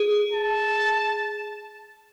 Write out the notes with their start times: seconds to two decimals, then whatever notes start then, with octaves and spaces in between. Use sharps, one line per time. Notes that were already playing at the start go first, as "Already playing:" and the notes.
Already playing: G#4
0.32 A5